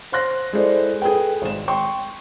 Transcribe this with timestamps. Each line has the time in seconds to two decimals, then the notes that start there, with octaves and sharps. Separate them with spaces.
0.12 C5 C6 F#6 A#6
0.53 G#3 E4 G#4 A4 C5 D5
1.02 G#4 A4 B4 G5
1.42 G#1 G#3 E7
1.68 G5 C6 C#6